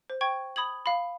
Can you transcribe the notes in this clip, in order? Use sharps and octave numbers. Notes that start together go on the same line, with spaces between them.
C5
G5 C#6 G#6
B5 D#6 G#6 F#7
F5 B5